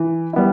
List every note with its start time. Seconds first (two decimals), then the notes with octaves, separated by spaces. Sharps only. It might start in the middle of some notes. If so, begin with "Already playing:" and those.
Already playing: E3
0.33 G3 B3 E4